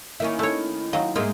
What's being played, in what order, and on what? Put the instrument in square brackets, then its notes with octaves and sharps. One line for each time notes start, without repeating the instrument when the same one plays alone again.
[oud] D#3 A#3 C#4 [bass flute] E4 [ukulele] E5
[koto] A3 C#5
[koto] F#3 D#5 [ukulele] F5 G5
[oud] G#2 G#3 A#3 [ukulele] D#4 A#4 E5 [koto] F4